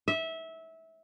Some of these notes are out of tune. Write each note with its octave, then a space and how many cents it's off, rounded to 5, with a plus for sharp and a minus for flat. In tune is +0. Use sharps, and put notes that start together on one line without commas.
E5 -20